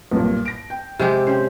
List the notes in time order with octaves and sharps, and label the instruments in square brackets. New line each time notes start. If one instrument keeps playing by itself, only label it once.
[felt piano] B1 G2 A#2
A#6 D7
G5
[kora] C3 G#3 G4
[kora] C4 C5 [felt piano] C#4 G5